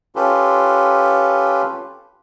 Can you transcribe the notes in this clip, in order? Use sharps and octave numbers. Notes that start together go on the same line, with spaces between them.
C#4 F4 G4 A4 B4